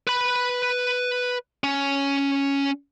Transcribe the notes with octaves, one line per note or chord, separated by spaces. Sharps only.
B4 B5
C#4